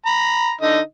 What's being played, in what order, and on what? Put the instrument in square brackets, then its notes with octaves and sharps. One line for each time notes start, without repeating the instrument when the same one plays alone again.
[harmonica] A#5 B5
D3 D#4 D#5